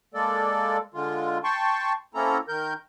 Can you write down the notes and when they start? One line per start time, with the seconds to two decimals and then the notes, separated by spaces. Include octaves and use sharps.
0.14 G#3 A#3 A4 D5
0.94 D3 G#3 F4
1.44 G5 A5 C6 C#6
2.15 A#3 C4 C#4 E4 A4 A#5
2.48 D#3 A#4 G6